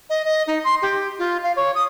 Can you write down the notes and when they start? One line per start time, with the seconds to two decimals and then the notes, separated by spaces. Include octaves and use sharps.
0.10 D#5
0.25 D#5
0.47 D#4
0.64 C6
0.82 G4
1.19 F4
1.43 F5
1.56 C#5
1.75 D#6